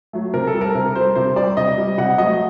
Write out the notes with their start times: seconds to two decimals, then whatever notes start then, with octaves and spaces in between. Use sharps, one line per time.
0.13 F#3 A3
0.34 C3 A#4
0.47 A4
0.54 G3
0.61 A#4
0.75 C3 A#4
0.95 G3 C5
1.15 C3 C5
1.36 G3 D5
1.57 C3 D#5
1.78 G3
1.98 C3 F#5
2.18 F#3 A3 D#5